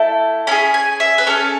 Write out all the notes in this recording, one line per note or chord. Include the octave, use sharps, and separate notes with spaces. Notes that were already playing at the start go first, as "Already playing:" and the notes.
Already playing: A3 E4 A4
C#4 E4 G#4 B5
G#5
E5
B4
C#4 G#4 A4